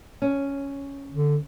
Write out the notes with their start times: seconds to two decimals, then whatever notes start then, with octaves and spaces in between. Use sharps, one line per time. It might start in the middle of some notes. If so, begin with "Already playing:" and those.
0.22 C#4
1.12 D3